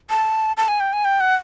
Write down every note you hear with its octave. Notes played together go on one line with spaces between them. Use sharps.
A5
A5
G#5
G5
G#5
G5
F#5